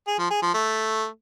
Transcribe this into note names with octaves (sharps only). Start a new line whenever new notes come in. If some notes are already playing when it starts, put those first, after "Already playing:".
G#4
F3
G#4
F3
A3